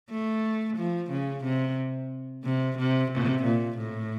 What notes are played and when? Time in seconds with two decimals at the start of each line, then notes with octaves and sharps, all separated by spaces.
0.10 A3
0.77 F3
1.11 C#3
1.44 C3
2.45 C3
2.78 C3
3.11 C3
3.45 A#2
3.78 A2